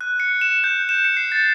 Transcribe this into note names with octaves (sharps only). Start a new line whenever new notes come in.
F#6
C#7
E7
G6
E7
C#7
C7
A6